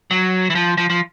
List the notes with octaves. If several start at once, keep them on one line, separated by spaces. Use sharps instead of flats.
F#3
E3
F3
F3
F3